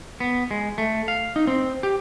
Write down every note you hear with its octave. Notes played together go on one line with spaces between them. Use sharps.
B3
G#3
A3
F5
D#4
C4
G4